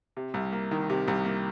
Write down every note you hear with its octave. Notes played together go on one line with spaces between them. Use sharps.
C3
C2
A#3
D#3
C3
C2
A#3